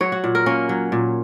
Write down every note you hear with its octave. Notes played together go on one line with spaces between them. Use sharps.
F#3 C#5
F#4
A#2
A#4
A#3 C#4
F#3
A#2